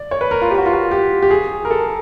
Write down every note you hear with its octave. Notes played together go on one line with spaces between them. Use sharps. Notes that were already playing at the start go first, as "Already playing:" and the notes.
Already playing: D5
C#5
B4
A#4
F4
G4
F#4
F4
F#4
G4
G4
G#4
A#4
A4